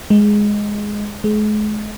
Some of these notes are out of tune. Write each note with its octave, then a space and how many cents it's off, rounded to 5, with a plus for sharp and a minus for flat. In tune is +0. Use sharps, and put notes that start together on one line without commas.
G#3 +0
G#3 +35